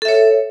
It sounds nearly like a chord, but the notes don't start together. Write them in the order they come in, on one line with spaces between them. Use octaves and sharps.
A4 E5 C#5